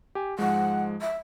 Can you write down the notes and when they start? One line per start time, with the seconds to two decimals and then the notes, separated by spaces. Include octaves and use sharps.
0.15 G4 G#5
0.39 G#2 F3 G#3 F#5
1.01 E5